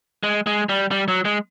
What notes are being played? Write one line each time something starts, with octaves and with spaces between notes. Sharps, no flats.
G#3
G#3
G3
G3
F#3
G#3